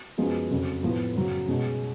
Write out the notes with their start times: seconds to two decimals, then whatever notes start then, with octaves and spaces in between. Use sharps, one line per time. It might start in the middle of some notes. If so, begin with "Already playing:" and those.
0.18 F#2 F3 G#3 B3 F#4
0.51 F2 C#3 F#3
0.83 A2 F3 B3
1.15 F#2 C#3 F#3
1.48 B2 G#3 C#4 G#4